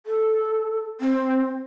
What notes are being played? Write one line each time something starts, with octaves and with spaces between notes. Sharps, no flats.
A4
C4